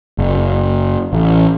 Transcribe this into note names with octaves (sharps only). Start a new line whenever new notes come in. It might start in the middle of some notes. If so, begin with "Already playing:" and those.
F#1
A1